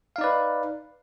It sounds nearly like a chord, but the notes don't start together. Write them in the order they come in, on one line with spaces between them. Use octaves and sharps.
F5 D#4 D5 B4